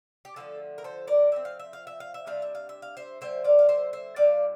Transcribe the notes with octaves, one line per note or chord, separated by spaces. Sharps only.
G4
D3 F3 A3 F4 A4
A#4
A4 C5
A#4 D5
D3 F3 C4 E5
F5
E5
F5
E5
F5
E5
C3 G3 D4 F5
E5
F5
E5
F5
C5 E5
D3 G3 C4 C5 E5
D5 F5
F5
C5 E5
C5 E5
A#2 G3 D4 D5 F5